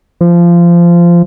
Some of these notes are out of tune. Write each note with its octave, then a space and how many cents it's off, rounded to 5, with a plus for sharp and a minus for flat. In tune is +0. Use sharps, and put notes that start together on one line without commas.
F3 -20